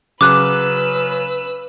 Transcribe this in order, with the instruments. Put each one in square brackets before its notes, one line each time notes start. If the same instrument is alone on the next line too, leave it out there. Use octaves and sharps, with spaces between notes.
[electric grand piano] C#3 F#3 [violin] B4 E6 [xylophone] D6 F#6